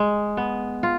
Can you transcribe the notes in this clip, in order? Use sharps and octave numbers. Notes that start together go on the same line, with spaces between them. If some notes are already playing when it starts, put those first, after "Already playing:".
Already playing: G#3
B3
F4